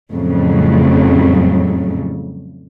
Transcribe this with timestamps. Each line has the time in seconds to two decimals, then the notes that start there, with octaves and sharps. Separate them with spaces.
0.12 F2 A2 C#3 F#3 G3